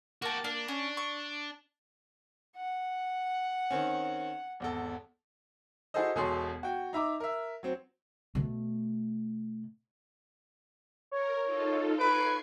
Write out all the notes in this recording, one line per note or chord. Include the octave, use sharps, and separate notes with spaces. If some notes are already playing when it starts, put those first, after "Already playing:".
A#3 F#4 G4 A5
A#3 D4
C#4
C#6
F#5
D#3 C4 C#4
G#1 E2 A4
E4 F#4 G#4 A4 C5 D#5
E1 B2 G#4 A4 C#5 C6
F#4 G5
D#4 E5 A#5 D6
A#4 E5
F#3 C4
B2 A3
A#4 C#5
D#4 F4 A4
B4 C#6 G#6 C7 D7